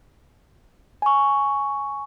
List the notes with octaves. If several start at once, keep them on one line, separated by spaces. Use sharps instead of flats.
G#5 C#6